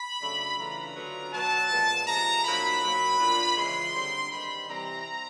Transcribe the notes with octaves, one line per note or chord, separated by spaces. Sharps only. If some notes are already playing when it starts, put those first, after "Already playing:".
Already playing: B5
F#2 C#3 F#3 A3 D4
C#3 E3 A3 D4 F4 A#5
D3 F#3 B3 D4 F4
B2 F#3 B3 A5
A#2 F3 G#3 B3
C3 F3 G#3 A#5
A#2 F#3 A#3 D#4 B5
B2 F#3 A#3
A#2 F3 A#3 D4 F4
C#3 E3 G#3 C#4 C6
D3 G3 C4 D#4
G2 D#3 G3 B5
C3 E3 G3 C4 A#5